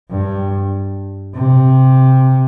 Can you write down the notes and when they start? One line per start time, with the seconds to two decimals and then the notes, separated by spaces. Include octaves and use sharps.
0.10 G2
1.35 C3